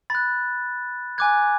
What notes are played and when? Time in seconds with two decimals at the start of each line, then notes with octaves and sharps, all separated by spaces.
0.10 B5 F#6 A6
1.18 G#5 D6 F#6 G#6